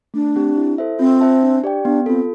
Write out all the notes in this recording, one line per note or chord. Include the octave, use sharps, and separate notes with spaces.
A3 D4
C4 G4
E4
A4 C5 E5
C4 F4
C5 E5 A5
D4
G4 D5 G5
B3 D4
C4 F4 A4